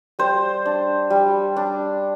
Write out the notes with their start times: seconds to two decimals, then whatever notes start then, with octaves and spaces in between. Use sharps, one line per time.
0.19 G3 C5
0.66 D4
1.10 G3
1.57 D4